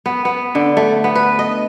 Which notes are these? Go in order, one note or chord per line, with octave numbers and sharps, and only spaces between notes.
B3
B3
D3
A3
B3
B4
D#5